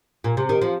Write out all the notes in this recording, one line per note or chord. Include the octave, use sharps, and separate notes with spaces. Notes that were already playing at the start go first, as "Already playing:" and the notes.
A#2
C3
D#3
F3